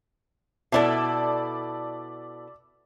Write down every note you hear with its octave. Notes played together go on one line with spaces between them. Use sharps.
B2 E4 A4 D5 E5